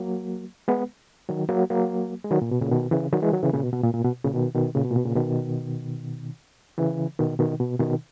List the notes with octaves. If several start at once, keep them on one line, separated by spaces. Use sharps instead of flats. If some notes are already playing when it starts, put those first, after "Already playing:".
Already playing: F#3 A#3
G#3 B3
D#3 F#3
F#3 A#3
F#3 A#3
G#3
D#3 F#3
A#2
B2
A#2 C#3
B2 D#3
C#3 E3
D#3 F#3
E3 G#3
D#3 F#3
C#3 E3
A#2 C#3
B2
B2
A#2
A#2
B2
A#2 C#3
B2 D#3
B2 D#3
A#2 C#3
B2
A#2
B2
A#2 C#3
B2 D#3
C#3 E3
B2 D#3
B2 D#3
B2
B2 D#3